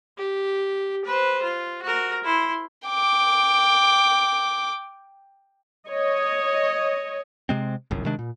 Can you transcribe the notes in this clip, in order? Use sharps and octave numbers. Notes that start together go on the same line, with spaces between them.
G4
B4 C5
F4
F#4 A#4
E4 C6
G5 D6
C#5 D#5
C3 G#3 C4
G1 C2 F#2
C3 D#3 G#3 D4
A#2